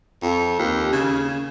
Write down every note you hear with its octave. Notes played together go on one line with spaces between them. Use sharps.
F2
D#2
C#3